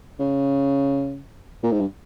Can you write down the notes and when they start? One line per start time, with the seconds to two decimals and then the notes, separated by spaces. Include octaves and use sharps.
0.19 C#3
1.63 A#2
1.71 G#2
1.80 G2